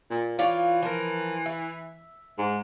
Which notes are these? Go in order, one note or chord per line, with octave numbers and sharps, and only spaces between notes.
A#2
E3 F4 C#5 D5
F3 A#4
E5
G#2